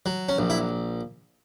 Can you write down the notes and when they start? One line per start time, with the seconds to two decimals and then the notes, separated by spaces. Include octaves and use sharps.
0.06 F#3
0.29 C#4
0.38 A#1
0.50 E4